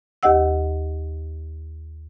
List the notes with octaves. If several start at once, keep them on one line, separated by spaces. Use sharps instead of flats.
D#2 G4 D#5 F#5 E6